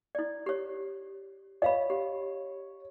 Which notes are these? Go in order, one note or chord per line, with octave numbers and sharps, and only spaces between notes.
E4 D5
G4 C#5
C#5 D#5 F5 B5
G4